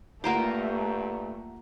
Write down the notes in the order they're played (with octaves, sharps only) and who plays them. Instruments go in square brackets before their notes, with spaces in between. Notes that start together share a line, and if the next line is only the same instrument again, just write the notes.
[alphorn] G2 [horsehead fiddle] A3 [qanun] A#3 F4 G4 [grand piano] F#5 A#5 C7